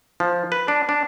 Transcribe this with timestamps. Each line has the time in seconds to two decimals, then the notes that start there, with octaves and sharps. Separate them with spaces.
0.20 F3
0.52 B4
0.68 D4
0.89 D4